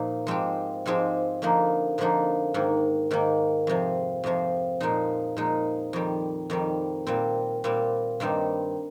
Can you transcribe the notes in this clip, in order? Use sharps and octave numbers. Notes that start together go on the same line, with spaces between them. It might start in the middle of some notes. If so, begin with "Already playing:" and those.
Already playing: A#2 F3 A#3 D#4
G#2 F3 G#3 C4 G4
G#2 F3 G#3 C4 G4
F2 D3 F3 A#3 D#4
F2 D3 F3 A#3 D#4
G#2 D#3 A#3
G#2 D#3 A#3
F2 C3 F3
F2 C3 F3
A#2 F3 G#3 D#4
A#2 F3 G#3 D#4
F2 D#3 G3
F2 D#3 G3
A#2 G3 C4
A#2 G3 C4
G2 D#3 G3 C4 D#4